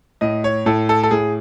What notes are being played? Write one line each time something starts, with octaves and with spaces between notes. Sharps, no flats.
A2 D#5
C#5
A2 A4
A4
A4
A2 G#4